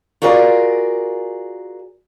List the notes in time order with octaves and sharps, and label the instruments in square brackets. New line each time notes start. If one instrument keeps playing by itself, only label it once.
[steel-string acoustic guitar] F4 F#4 G#4 A#4 D5